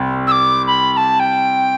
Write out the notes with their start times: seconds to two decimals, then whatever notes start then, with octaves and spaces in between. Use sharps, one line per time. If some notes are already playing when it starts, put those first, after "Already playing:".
Already playing: C2
0.27 E6
0.32 D6
0.67 B5
0.93 B5
0.97 A5
1.20 G5